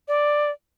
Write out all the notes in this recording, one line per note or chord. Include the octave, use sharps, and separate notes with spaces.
D5